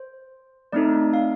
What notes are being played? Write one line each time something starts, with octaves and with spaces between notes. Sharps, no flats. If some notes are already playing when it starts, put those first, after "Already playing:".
Already playing: C5
A3 C4 D#4 A4 D5
F5